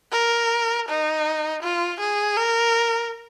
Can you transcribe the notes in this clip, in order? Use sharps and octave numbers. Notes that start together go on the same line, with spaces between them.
A#4
D#4
F4
G#4
A#4